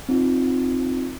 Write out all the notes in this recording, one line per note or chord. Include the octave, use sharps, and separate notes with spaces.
C4 D#4 F4